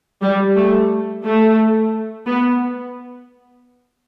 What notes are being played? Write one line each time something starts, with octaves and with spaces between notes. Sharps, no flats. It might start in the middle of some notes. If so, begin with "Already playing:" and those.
G3
A3
A3
B3